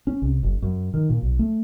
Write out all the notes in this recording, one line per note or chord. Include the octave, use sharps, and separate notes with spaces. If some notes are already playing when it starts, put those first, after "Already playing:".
C#4
C2
F#1
F#2
D#3
A#2
B1
A3